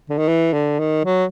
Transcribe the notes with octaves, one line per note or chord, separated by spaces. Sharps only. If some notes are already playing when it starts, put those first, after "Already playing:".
D3
D#3
E3
D3
D#3
F#3